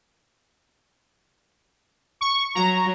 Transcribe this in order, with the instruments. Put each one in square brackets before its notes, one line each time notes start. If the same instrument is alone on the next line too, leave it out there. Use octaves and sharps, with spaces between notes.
[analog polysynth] C#6
[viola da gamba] F#3 [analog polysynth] A#5